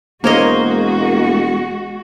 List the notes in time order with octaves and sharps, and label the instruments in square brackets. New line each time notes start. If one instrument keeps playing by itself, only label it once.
[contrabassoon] E1 [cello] G#3 F#4 [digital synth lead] A#3 [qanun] C5 C#5 D#5